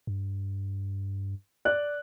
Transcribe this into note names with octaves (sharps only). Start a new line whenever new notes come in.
G2
D5 F#6